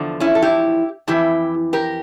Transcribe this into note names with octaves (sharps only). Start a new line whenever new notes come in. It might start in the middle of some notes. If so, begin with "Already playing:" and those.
Already playing: E2 D3 F3
C#4 E4
A4
E4 G4
F2 E3 E4 G4
G4 A#4